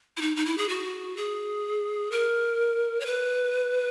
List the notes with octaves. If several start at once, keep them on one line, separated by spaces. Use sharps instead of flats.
E4
D#4
D#4
E4
G#4
F#4
G#4
A#4
C#5
B4